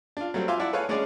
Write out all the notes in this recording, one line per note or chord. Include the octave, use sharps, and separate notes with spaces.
D4 F4
F#3 G3 A3 C4
F4 E5 F5 G#5 C6 D6
E4 D5 F#5 A5
A4 B4 C#5 F5 G#5
G#3 C#4 D4 G#4 D5